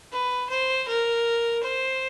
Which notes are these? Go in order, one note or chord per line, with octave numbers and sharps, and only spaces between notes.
B4
C5
A#4
C5